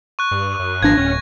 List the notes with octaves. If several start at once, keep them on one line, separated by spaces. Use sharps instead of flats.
C#6 F#6
G2
F#2
G#1 F3 D4 G#6 A#6
D1 C#4